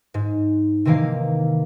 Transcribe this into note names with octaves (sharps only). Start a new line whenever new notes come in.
G#2
C3 D#3 E3 A#3 F5 C7